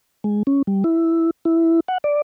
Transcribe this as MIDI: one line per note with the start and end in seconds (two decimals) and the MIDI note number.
0.24 0.43 56
0.47 0.62 61
0.67 0.84 55
0.84 1.30 64
1.45 1.80 64
1.88 1.98 78
2.04 2.22 74